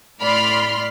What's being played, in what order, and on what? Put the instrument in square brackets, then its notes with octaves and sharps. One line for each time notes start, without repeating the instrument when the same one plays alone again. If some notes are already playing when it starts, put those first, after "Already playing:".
[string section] A2 D5 B5 C6 F6